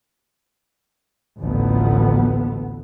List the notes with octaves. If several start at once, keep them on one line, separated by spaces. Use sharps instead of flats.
A1 D2 A#2 F3 A3 B3